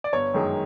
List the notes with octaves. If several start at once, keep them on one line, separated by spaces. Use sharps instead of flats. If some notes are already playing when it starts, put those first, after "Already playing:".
D5
G1 C#5
F#2 D#3 G#3